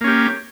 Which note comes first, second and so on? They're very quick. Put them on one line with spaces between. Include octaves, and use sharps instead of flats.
A#3 C#4 G4